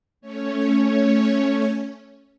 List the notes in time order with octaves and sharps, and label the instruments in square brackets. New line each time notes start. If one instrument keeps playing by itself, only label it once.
[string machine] A3 C#4 C#5